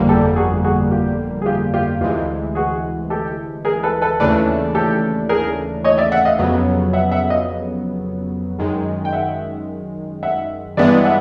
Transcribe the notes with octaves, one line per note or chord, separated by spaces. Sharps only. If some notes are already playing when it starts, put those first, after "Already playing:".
Already playing: G1 F2 D3 G3 A#3
G4 A4
F#4 G#4
F#4 G#4
F4 G4
G#4
F4 G4
F4 G4
D2 C3 E3 G#3 F4 G4
F#4 G#4
G4 A4
G#4 A#4
A4 B4
A4 B4
D#2 C#3 E3 A3 D4 A4 B4
G4 A4
G#4 A#4
C#5 D#5
D5 E5
E5 F#5
D#5 F5
F2 C#3 F#3 B3
E5 F#5
E5 F#5
D#5 F5
F#2 D#3 G#3
G5
E5 F#5
E5 F#5
G2 E3 G#3 B3 D4 D5 E5
E5 F#5